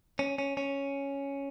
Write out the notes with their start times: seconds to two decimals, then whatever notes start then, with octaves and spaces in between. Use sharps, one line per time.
0.19 C#4
0.38 C#4
0.57 C#4